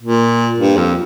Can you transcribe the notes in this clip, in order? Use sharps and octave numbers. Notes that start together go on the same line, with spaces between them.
A#2
G2
F2